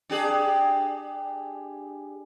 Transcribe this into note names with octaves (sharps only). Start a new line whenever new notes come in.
D4 G4 G#4